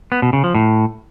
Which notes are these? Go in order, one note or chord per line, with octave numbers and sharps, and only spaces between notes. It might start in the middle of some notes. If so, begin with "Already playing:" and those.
B3
B2
C#3
F3
A2